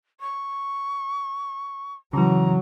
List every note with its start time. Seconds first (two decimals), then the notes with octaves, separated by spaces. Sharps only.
0.21 C#6
2.13 C#3 E3 F#3 A#5